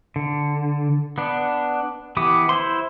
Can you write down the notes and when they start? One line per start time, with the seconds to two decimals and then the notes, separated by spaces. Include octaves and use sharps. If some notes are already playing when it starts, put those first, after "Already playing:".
0.16 D3
1.18 B3 D4
2.17 E3 B3 G4 D6 D#6
2.49 E4 C5 C6